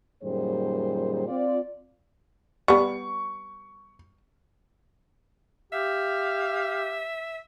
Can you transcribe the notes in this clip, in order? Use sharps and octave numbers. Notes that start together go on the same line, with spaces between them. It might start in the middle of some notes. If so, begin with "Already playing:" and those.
F#2 A#2 D#3 G3 G#4 C5
C4 F4 D5
G3 B3 C#6
G4 E5 F5